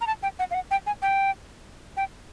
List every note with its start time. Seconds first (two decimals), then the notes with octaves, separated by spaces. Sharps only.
0.01 A#5
0.07 A5
0.23 G5
0.39 F#5
0.51 F5
0.55 F#5
0.71 G5
0.87 G#5
1.02 G5
1.97 G5